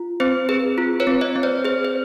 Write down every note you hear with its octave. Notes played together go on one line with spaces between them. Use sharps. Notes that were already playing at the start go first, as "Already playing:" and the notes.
Already playing: F4
C4 C5
G#4 B4
F4
B4 C#5
C4
C#5 D#5
C4
C5 D5
G#4 C5
C5